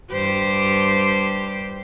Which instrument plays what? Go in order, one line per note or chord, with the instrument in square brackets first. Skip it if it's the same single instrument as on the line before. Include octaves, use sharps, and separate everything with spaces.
[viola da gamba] G2 G4 C5